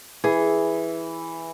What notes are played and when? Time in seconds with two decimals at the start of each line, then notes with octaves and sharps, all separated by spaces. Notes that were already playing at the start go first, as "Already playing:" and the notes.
0.24 E3 G#4